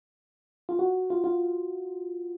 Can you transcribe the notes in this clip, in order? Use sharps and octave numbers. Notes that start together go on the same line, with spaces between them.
F4
F#4
F4
F4